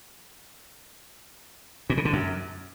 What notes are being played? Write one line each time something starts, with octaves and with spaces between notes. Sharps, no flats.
A#2
C#3
D3
F#2